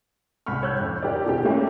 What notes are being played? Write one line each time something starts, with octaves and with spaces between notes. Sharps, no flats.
C2 B5 C#6 F6
C#5 E6 F#6 G6
F2
G4 A#4 D5
B2 G4
G3 A3 A#3 C#4 G4 A4